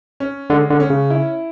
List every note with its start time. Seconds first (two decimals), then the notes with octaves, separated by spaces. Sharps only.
0.20 C#4
0.50 D3 G#3
0.70 D3
0.80 C#4
0.90 C#3
1.10 E4